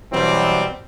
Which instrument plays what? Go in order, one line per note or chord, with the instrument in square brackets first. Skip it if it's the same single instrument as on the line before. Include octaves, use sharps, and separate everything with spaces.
[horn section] B2 E3 F#3 G3 C4